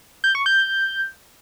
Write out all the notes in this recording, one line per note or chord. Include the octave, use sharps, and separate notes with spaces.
G6
C#6
G6